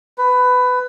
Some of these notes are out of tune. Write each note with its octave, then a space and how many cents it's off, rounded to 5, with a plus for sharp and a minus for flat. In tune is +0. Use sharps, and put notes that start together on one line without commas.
B4 +15